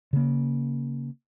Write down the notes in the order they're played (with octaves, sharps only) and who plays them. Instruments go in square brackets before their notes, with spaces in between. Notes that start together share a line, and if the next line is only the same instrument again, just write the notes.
[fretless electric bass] C#3 A#3